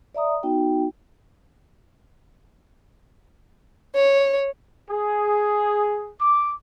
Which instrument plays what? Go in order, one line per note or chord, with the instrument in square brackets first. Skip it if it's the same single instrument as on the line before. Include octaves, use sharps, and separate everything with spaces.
[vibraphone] D5 E5 A#5 D#6
B3 D#4 F#4 G5
[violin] C#5
[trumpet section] G#4
D6